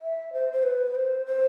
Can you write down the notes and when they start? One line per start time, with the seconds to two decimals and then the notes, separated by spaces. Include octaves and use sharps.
0.02 E5
0.33 C5
0.52 C5
0.63 B4
0.95 C5
1.26 C5